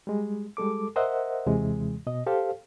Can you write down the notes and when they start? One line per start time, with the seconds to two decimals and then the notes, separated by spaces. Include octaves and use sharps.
0.07 G3 G#3
0.57 G3 G#3 A4 D6
0.96 A#4 C5 D#5 E5 F#5
1.46 D#2 C3 E3 G#3
2.07 B2 D#5
2.27 G4 A4 C5 F5